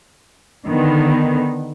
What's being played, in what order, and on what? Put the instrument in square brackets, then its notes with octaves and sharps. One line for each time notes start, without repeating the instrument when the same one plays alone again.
[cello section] D3 D#3 B3